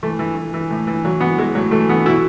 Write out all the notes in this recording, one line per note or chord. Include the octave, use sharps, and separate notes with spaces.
E3 A3
E3
E3
E3
A2
E3
E3 F#3
E3 B3
E3 G#3
A2 F#3
E3 A3
E3 B3
B2 E4